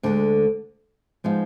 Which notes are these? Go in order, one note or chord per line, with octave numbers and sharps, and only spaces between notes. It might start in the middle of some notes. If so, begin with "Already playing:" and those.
D2 D3 G#3
F3 G#3 B3 D#4